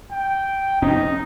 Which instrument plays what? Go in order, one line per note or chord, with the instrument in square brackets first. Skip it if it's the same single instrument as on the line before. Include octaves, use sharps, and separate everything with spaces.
[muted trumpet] G5
[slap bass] F1 C4 C#4 [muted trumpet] D#4